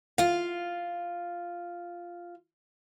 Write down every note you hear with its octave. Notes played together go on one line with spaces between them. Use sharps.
F4 F5